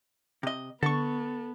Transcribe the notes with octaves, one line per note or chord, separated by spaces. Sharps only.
C3 D#5
D3 B3 A4 C#6